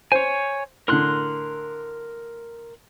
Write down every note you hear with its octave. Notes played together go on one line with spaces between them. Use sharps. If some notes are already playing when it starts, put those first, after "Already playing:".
C5 C#5 G#5
A2 D3 A#4 C6 F#6